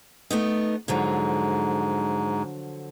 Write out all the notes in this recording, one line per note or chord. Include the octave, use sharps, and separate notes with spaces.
A3 B3 D#4
G#2 D3 F3 F#3